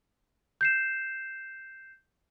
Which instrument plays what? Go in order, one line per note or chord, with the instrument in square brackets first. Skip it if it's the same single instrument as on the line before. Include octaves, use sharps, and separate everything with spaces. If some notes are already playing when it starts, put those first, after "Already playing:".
[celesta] G6 C7 E7